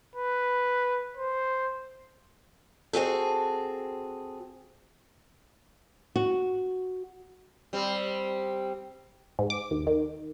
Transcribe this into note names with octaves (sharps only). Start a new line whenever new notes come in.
B4
C5
C4 F#4 G#4 A4
F#4
G3 C4
G#2
D6
D#2
D#3